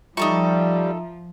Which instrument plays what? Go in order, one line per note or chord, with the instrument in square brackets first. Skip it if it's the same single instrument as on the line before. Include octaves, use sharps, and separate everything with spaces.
[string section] F3 [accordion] G3 [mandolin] D#4 A4 C#6 [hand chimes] F4 E5 A#5